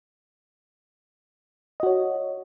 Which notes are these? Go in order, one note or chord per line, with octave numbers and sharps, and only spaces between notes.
F#4 C#5 D#5